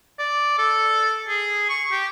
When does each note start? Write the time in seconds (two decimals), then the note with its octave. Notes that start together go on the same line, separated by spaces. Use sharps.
0.19 D5
0.58 A4
1.28 G#4
1.69 C#6
1.92 G4